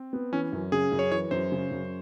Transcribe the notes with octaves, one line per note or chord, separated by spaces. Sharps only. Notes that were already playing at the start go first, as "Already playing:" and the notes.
Already playing: C4
B3
E3 C#4
F#2
C#3 G#4
F#2
C#5
E3 C#5
F#2 C5
C#3
F#2